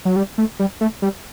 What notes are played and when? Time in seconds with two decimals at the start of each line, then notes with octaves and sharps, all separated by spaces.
0.05 F#3
0.16 G3
0.38 A3
0.59 G3
0.81 A3
1.02 G3